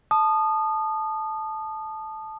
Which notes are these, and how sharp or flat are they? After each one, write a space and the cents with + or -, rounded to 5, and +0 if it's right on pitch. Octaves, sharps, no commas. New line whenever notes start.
A5 -10 D#6 -25